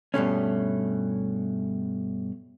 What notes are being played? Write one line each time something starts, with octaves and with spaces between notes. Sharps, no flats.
G2 B2 A3 C#4